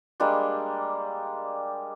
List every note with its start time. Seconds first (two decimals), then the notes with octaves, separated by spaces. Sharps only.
0.20 G3 G#3 A#3 D4